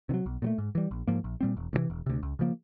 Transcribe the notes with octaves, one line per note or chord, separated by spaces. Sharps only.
C3 D#3 F#3
B1
A#2 F#3 A3
G#2
E3 G3
A#1
G#2 F3 A#3
A#1
A#2 G3 C4
E1
D2 C3 E3
E1
D2 C3
C#2
C#3 F3 A#3